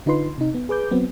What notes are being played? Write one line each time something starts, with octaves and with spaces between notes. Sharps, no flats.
D3 D#4 F4 B4 C6
C3 D#4
B3
G#4 B4 D6 G6
F#3 B3 C4